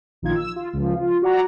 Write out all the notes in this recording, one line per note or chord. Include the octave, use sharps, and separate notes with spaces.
A#1 D#3 D#4 F4 G#6
E6
F4
C#2 F3
F4
F#4 D5 F#5 A#5